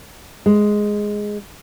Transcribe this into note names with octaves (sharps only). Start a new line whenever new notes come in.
G#3